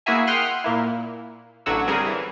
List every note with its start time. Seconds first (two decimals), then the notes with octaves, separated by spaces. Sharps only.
0.06 A#3 E4 F#4 G#4 E5 G#5
0.27 F#5 G5 C6 D#6 F6 F#6
0.64 A#2 A#3 E4
1.66 A1 D3 F#3 F#4 E6
1.88 C#3 G3 C4 G#4 A#4
2.06 E3